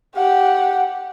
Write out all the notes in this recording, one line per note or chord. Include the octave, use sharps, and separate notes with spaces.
G4 F#5